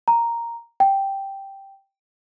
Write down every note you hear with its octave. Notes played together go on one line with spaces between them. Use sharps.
A#5
G5